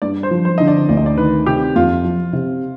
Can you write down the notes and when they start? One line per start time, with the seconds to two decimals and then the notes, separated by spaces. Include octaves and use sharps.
0.02 G2 D5
0.23 C5
0.31 F3
0.45 C5
0.58 D3 D#5
0.68 D5
0.89 D2 D5
0.97 D#5
1.06 D5
1.17 D#3 B4
1.46 C3 G4
1.76 F2 F4
2.04 F3
2.33 C3